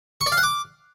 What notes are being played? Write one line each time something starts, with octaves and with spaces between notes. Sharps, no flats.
C#6
D5
F5
F#5
D6